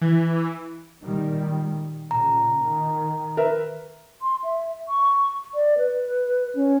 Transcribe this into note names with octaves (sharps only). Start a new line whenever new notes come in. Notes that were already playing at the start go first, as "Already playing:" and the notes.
E3
A#2 D#3 G3
A#2 C#3 A#5
D#3
A#4 B4 E5
C6
E5
C#6
D5
B4
C#4